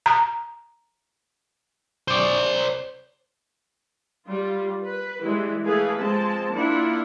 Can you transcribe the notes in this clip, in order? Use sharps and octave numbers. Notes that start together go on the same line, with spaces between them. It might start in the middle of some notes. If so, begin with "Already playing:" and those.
A#5
C5 D5
G3 F4
B4
E3 G3 G#3 E4
E3 A3 G#4 A4 B4 F5
F3 G#3 C4 A5
A#3 D4 E4 F4 F#5